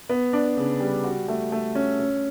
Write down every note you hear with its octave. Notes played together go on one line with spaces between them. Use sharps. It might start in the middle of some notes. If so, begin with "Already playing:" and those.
B3
D4
C#3
G3
F#4
A3
A3
C#4
C#4